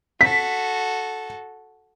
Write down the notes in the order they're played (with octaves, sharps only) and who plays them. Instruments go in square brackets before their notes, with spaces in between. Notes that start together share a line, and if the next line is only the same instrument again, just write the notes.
[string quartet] F#4 A4 [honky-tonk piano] B6